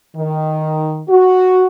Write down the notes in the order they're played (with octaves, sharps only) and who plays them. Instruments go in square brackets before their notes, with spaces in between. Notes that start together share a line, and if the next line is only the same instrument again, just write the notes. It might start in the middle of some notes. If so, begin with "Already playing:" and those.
[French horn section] D#3
F#4